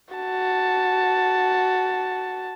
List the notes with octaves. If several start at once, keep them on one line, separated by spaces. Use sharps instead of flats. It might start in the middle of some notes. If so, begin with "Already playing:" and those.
F#4 A5